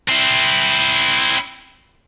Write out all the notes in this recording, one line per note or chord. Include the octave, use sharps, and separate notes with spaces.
C4 E4